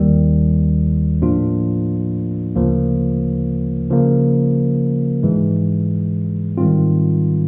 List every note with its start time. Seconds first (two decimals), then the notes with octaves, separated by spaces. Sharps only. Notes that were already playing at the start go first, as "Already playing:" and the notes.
Already playing: D#2 D#3 G3
1.22 A2 F3 A#3 D4 F4
2.56 D2 C#3 F3 A#3
3.90 C#3 F3 A#3
5.23 G#2 E3 G#3
6.57 G#2 D#3 G3 C4 F4